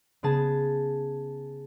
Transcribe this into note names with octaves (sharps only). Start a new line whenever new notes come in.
C#3 B3 G#4 A5